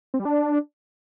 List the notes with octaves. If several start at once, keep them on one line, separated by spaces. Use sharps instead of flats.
C4
G3
D4